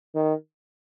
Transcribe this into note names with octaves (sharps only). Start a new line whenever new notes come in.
D#3